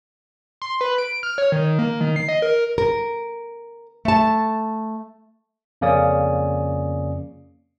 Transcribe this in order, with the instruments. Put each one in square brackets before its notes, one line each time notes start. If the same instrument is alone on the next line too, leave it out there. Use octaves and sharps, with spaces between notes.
[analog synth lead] C6
B4
D7
F6
C#5
D#3
A#3
D#3
C7
D#5
A#4
[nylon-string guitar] A#4
A3 A5
[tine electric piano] F2 C#3 A#3 C#4 D5 D#6